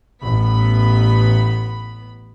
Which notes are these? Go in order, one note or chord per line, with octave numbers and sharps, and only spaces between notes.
A1 B3 B5